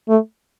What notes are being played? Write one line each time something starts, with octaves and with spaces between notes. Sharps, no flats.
A3